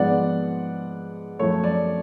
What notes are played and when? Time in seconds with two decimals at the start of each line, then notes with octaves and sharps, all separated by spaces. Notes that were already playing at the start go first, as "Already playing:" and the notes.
Already playing: G#2 F3 B3 D5 F#5
1.39 F#2 F3 A3 C#5
1.64 D5